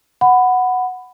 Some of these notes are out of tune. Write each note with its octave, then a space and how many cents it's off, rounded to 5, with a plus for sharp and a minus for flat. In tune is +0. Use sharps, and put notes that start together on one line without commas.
F#5 +0 B5 +15